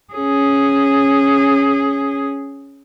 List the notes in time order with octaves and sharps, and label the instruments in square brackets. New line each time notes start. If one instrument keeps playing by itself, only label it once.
[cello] C#4 G#4